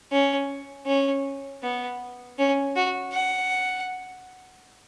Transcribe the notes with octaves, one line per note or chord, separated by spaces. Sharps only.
C#4
C#4
B3
C#4
F#4
F#5